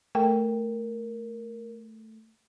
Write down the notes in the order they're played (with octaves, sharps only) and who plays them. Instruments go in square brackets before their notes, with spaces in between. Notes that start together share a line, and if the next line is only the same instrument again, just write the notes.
[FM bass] A3 [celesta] A#4 [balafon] G5